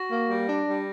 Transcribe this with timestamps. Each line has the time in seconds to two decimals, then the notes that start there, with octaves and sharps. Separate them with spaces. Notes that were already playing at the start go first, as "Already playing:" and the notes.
Already playing: F#4 A#6
0.10 A#3
0.29 G3
0.48 D4
0.67 G3